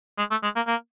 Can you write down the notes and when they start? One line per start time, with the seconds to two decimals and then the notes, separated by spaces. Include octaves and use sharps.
0.18 G#3
0.31 A3
0.43 G#3
0.56 A#3
0.67 A#3